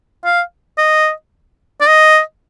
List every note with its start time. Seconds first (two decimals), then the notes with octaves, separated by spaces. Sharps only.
0.25 F5
0.78 D#5
1.81 D5
1.87 D#5